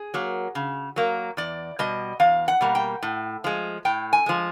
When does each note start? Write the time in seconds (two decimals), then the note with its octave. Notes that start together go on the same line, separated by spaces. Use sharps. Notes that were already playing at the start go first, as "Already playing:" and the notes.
Already playing: G#4
0.14 F#3 A#3
0.55 C#3
0.96 F#3 A#3
1.37 E2 D5
1.79 B2 G3 D#5
2.20 E2 F5
2.48 F#5
2.61 B2 G3 A#3
2.75 G5
3.03 A2
3.44 F3 G#3
3.85 A2 G5
4.13 G#5
4.26 F3 G#3